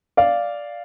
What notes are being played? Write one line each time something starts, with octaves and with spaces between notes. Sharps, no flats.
D5 F5